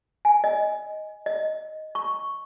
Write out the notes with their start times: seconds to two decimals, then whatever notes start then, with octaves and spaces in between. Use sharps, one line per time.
0.25 G#5
0.44 D#5
1.26 D#5
1.95 C#6